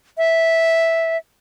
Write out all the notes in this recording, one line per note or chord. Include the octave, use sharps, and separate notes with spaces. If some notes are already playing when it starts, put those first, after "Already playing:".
E5